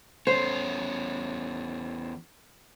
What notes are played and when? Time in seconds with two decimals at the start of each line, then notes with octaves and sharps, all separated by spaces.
0.27 E2 C#4 C5